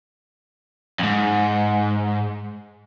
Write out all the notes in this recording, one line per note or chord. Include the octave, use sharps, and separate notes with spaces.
F2 G#2